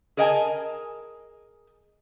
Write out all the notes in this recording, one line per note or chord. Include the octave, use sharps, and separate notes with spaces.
G#4 A#4 D#5 F5 G#5 A5